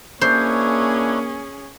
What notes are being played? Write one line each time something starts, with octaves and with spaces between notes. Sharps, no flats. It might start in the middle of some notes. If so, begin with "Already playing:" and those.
A#3 C#4 D4 E4 G#4 C5 C#5